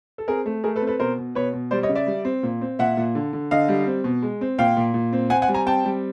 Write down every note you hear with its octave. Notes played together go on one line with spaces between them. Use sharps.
A4
C4 G#4 A#4
A3
A3 G#4 A#4
A4 B4
C4
A4 B4
B2 A#4 C5
B2
B2 B4 C#5
B2
G3 C5 D5
C#5 D#5
C#3
D5 E5
G3
C4
A#2
C4
A#2 E5 F#5
A#2
D3
D3
D3 D#5 F5
G3
C4
B2
G#3
C4
A#2 F5 G5
A#2
A#2
C4
C4 F#5 G#5
F#5 G#5
G3
G#5 A#5
C4 G5 A5
G3